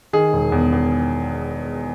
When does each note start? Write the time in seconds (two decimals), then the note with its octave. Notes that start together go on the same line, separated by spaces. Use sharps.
0.13 D#3 G#4
0.33 E1
0.52 E2
0.73 E2